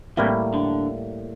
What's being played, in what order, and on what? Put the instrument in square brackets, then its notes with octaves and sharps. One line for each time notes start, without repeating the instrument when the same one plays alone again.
[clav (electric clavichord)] A2 G3 A#3 E4 [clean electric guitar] C3 E3
[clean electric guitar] D3